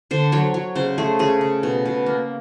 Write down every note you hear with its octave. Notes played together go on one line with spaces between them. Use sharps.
D3 C5
F#3 C#5
F#3
C#3 C5
A3 G#4
C#3 G#4
C#3
B2
B2
A#3